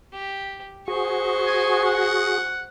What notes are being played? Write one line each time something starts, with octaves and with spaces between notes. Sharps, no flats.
G4
F#4 G#4 C5 C#6
G#5
F#5